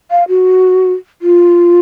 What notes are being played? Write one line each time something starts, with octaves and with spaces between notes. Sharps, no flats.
F5
F#4
F4